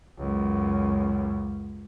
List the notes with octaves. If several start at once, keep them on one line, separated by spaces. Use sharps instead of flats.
C#2 F#2